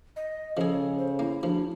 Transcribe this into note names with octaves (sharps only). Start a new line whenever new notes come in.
D#5
C#3 F3 G#4 A4
C5
A#3 E4
D2 F3